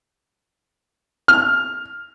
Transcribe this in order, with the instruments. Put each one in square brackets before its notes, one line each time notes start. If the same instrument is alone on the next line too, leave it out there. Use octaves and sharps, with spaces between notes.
[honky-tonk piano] F6